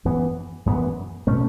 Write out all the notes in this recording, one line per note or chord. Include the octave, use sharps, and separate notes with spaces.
F#2 E3 B3
F#2 E3 B3
B2 A3 C#4